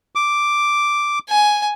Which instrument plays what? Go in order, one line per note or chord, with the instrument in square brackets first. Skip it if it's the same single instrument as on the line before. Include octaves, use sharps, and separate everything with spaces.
[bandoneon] D6
[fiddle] G#5